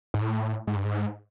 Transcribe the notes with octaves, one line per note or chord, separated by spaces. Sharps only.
G#2
A2
G#2
G2
G#2